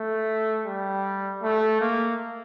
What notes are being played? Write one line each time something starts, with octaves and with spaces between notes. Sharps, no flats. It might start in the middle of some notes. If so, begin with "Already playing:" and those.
Already playing: A3
G3
A3
A#3